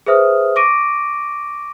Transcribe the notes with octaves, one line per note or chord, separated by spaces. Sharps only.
G#4 B4 C5 E5 D#6 F6
C#6 D6 A#6 D7 D#7